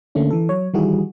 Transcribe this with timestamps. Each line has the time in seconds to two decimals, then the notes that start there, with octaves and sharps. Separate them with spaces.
0.15 D3 A3 A#3 C#4 D4
0.31 E3 A4
0.49 F#3 C#5
0.74 D#3 E3 G3 E4 F#4 G#4